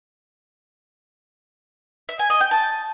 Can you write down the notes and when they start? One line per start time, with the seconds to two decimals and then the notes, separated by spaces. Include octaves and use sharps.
2.09 E5
2.19 G#5
2.30 D#5
2.41 G5
2.51 A5